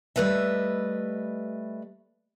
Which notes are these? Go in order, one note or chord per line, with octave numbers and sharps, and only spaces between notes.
G3 A3 B4 D#5 E5